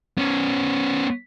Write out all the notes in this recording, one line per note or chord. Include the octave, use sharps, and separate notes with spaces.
B3 C#4